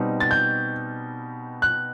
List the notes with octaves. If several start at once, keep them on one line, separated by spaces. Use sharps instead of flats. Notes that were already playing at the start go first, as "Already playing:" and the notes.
Already playing: B2 G3 C4 D#4
A6
G6
F#6